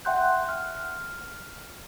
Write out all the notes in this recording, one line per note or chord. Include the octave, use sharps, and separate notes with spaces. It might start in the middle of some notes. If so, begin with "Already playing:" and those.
E5 F#5 G5 C6 F#6 G6
F6